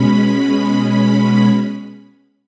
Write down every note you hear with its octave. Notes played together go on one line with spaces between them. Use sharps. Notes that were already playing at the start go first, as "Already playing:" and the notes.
Already playing: B2 G#3 C#4 B5